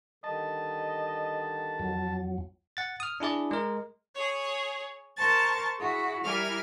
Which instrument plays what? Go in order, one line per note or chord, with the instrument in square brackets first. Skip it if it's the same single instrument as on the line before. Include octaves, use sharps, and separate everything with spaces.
[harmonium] D3 D#3 G3 [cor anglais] D#5 [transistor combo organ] A5
[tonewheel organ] F2 F#3
[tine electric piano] F#5 A6
D#6 F6
D4 E4 G#4 D5
G#3 A#4
[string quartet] G#4 C#5
A#4 C5 A5 C#6 A6
E4 F#4 G#4
G3 E4 A#4 G#5 F6